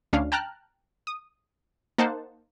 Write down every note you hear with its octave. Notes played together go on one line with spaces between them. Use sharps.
D2 C#4 D4 F5
G5 A5 A#5 F6 F#6
D#6
A#3 D#4 C5 F#5 A5